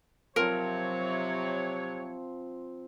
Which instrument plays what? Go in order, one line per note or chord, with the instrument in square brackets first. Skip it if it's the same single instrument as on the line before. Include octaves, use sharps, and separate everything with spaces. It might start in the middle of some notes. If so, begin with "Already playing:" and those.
[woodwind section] C3 F#3 C#5 [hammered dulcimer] F3 C4 [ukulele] A#4